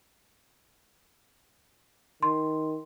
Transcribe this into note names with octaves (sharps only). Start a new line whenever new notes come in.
D#3 C6